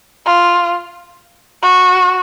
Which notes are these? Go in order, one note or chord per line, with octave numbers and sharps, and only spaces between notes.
F4
F#4